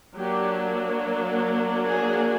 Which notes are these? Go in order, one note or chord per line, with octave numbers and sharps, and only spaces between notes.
F#3 A#3 D4 G4
G#4